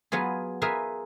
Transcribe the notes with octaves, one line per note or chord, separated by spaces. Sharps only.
F#3 B3 F4 G#4
F4 G#4 A#4 B4 E5 F5